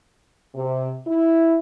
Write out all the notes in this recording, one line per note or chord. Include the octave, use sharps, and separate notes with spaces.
C3
E4